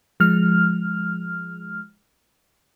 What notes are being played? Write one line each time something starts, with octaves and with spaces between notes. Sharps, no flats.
F3 G#3 F6